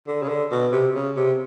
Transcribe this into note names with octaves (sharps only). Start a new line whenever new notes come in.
D3
C#3
D3
B2
C3
C#3
C3